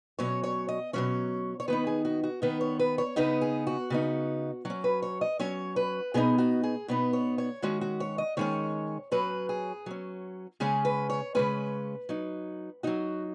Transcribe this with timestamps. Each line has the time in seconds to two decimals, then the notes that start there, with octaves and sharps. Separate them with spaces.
0.19 B2 F#3 C#4 C#5
0.43 C#5
0.68 D#5
0.93 B2 F#3 C#4 C#5
1.60 C#5
1.68 D#3 B3 D#4 B4
1.87 G#4
2.05 F#4
2.23 F#4
2.42 D#3 B3 D#4 B4
2.61 C#5
2.79 B4
2.98 C#5
3.16 C#3 B3 D#4 B4
3.41 G#4
3.67 F#4
3.90 C#3 B3 D#4
4.65 F#3 C#4 F#4
4.84 B4
5.02 C#5
5.21 D#5
5.39 F#3 C#4 C#5
5.76 B4
6.14 B2 B3 D#4 G#4
6.38 F#4
6.63 G#4
6.88 B2 B3 D#4 B4
7.13 C#5
7.38 C#5
7.62 D#3 G#3 C#4 F#4
7.81 F#4
8.00 C#5
8.18 D#5
8.37 D#3 G#3 C#4 C#5
9.12 F#3 C#4 B4
9.49 G#4
9.86 F#3 C#4
10.60 C#3 G#3 C#4 G#4
10.85 B4
11.10 C#5
11.35 C#3 G#3 C#4 B4
12.09 F#3 D#4
12.83 F#3 D#4 F#4